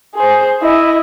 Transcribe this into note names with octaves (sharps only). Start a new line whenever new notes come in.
G#4 C5
E4 D#5